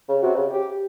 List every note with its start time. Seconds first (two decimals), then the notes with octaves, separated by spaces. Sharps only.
0.09 C#3
0.22 C3 F#4
0.36 C#3
0.51 G4